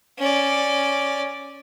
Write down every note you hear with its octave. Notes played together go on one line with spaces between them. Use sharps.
C#4 D5